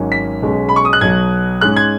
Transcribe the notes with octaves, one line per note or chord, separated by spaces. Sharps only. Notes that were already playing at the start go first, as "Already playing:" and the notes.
Already playing: G#1 G#2 F#3 C#4
B6
B1 B2 G#3 C#4
B5
C#6
D#6
F#6
B1 B2 F#3 G#6
G#2 G#3 C#4 F#6
G#6